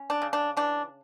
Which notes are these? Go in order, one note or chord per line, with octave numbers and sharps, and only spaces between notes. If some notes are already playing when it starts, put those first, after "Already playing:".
Already playing: C#4
D4
C#3
D4
E3 D4